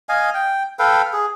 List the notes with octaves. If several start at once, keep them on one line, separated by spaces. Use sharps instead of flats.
D#5 F5 G#5
G5
A4 B4 F5 G5
G#4